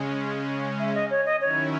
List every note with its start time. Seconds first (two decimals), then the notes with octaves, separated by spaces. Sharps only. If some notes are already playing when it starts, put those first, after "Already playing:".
Already playing: C#3 G#3 C#4
0.79 E5
0.95 D#5
1.10 C#5
1.26 D#5
1.41 D#3 F#3 C#4 E4 C#5